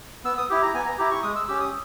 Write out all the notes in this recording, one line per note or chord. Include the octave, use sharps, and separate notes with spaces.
B3 E6
D#6
E4 G4
A#5
B3 G#5
A#5
E4 G4 A#5
C#6
G#3 D#6
E6
C#4 G4 E6
D#6